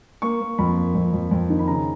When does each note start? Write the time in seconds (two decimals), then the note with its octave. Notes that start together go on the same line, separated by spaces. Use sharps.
0.22 A#3 C#6
0.41 A#3
0.58 F2 B5
0.77 A#3
0.95 F2
1.13 F2
1.31 F2
1.50 D#3
1.59 B5
1.68 C#3 A#5